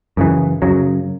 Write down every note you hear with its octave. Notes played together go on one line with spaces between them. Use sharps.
F#2 C#3 E3
F#2 C#3 F#3